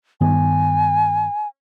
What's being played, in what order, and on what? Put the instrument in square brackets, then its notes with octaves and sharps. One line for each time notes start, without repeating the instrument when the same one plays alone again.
[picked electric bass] G2 D#3 B3 [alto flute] G#5